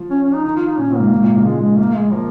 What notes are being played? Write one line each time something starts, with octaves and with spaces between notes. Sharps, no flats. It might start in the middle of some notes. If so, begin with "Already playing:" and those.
Already playing: F3
C#4
C#4
D#4
D#3 D#4
F4
D#4
A#2 C#4
A#2
G#2 A#3
G#2
A#2
C#3
F3 G#3
G#3
A#3
G#3
F3 A#3